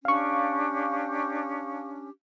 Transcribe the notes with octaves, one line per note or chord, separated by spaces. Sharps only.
C#4 D4 G4 F5 C#6